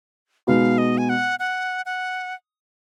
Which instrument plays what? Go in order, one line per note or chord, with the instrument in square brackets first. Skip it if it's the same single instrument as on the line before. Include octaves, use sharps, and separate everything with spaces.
[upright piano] B2 G#3 B3 D#4 F#4 [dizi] F5
[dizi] D#5
G#5
F#5
F#5
F#5